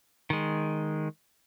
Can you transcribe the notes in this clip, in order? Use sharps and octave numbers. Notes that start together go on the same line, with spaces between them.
D#3 G#3